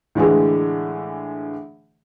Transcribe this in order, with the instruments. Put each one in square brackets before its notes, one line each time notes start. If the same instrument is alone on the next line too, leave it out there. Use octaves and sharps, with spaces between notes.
[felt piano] A2 D3 E3 G#3